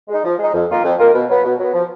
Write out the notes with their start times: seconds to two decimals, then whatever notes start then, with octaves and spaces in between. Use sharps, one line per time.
0.08 G#3 D#4
0.23 F3
0.39 G#3 D#4
0.53 F2
0.69 D#3 A#3 F4 A#4
0.84 F2
0.99 D#3 A#3 F4 A#4
1.14 B2
1.29 F#3 B3
1.44 B2
1.59 F#3 B3
1.73 F3